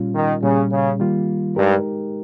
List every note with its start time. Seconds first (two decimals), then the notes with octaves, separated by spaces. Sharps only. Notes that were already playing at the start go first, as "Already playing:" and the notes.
Already playing: A#2 G3 C#4 F4
0.14 D#3
0.42 A#2 C#3 G3 C#4
0.71 C#3
0.99 D#3 G3 A#3 F4
1.56 G2 G#3 D#4 G4 A#4